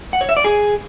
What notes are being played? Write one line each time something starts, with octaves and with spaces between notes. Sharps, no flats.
F#5
C#5
E5
D5
G#4